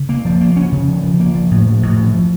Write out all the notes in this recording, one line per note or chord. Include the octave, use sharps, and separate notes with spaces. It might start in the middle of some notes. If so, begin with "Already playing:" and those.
Already playing: C#3
A#3
F3
A#3
C#4
C#3
F3
F3
A#3
F3
A2
F3
A2
F3
F3